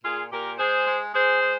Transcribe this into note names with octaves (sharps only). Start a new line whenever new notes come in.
A#2 F4 G#4
A#2 G4 A#4
G#3 G#4 C5
G#3
G#3 G#4 C5
G#3